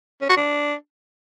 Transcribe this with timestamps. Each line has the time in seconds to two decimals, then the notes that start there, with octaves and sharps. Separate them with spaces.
0.21 C#4
0.29 F#4
0.37 D4